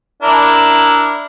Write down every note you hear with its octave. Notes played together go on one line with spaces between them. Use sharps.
D4 E4 A#4